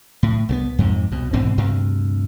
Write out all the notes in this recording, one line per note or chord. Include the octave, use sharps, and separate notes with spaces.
A2
C2 E3 B3
F2 G#2 C3
C2 B2
G#2 B2 E3 C4
D2 G2 C3